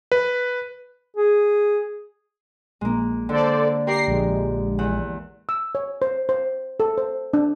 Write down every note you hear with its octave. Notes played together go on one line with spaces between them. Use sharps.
B4
G#4
A#1 G#3 A#3
D3 A4 C5 D5
G4 A#4 D5 A#6 C7
A#1 G#3
E2 F#5 F#6
E6
C#5
C5
C5
A4
C5
D4